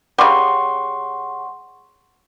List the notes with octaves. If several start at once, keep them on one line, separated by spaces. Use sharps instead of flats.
C#3 G3 F#5 C6 C#6